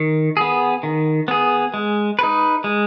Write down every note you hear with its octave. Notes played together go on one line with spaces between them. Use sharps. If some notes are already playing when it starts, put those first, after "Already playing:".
Already playing: D#3
B3 G#4
D#3
B3 G#4
G#3
D#4 B4
G#3